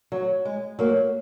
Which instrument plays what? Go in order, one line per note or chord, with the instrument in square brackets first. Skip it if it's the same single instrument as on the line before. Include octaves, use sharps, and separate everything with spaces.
[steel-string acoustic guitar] F#3
G#3
F#3 A#3